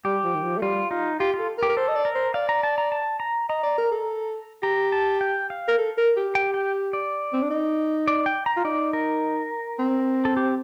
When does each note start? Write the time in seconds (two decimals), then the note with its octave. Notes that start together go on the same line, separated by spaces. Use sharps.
0.05 G3 G4
0.24 F3
0.35 D#3
0.43 F3
0.57 A3
0.62 G3 F4
0.91 D#4 F4
1.20 F4 G4
1.34 F4
1.39 A4
1.58 A#4
1.63 G4
1.69 A#4
1.77 A4 C5
1.88 D#5
1.95 D5
2.05 A#4
2.15 C5
2.34 D5 F5
2.49 A#5
2.63 A5
2.78 A#5
2.92 A5
3.20 A#5
3.49 D#5 A#5
3.63 D5
3.78 A#4
3.91 A4
4.63 G4 A#5
4.92 A5
5.21 G5
5.50 F5
5.68 A#4
5.78 A4
5.97 A#4
6.17 G4
6.35 G5
6.54 G5
6.93 D5
7.33 C4
7.42 D4
7.50 D#4
8.08 D5
8.26 G5
8.46 A#5
8.57 F4
8.65 D#4 D5
8.93 A#4
9.79 C4
10.25 A4
10.37 G4